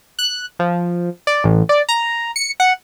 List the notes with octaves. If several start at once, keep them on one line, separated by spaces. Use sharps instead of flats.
F#6
F3
D5
A1
D5
A#5
C#7
F#5